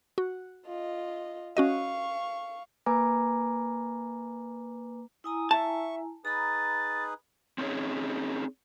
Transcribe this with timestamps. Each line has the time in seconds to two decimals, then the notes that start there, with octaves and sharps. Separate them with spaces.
0.18 F#4
0.66 F4 D#5
1.57 C#4 F#4 D#5 F5 C#6
2.86 A#3 B4 G#5 A#5 D6
5.24 E4 G#5 A#5 D#6
5.51 E5 A5 C#6
6.25 D#4 G#4 B4 A#5 B5 A6
7.58 C4 C#4 D#4 G#4 C#5